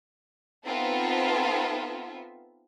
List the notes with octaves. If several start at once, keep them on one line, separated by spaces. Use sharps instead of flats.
B3 C4 D#4 F4 A4 E5